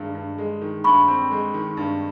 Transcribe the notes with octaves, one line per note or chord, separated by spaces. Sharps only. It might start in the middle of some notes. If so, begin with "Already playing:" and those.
Already playing: G2 D#3 G#3
G2
G#3
D#3
G2 B5 C#6
C4
G#3
D#3
G2